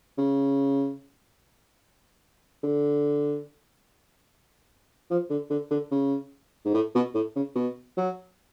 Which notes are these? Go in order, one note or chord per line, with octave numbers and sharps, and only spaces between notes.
C#3
D3
F3
D3
D3
D3
C#3
G#2
A2
B2
A2
C#3
B2
F#3